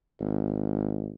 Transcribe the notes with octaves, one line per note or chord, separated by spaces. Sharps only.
G#1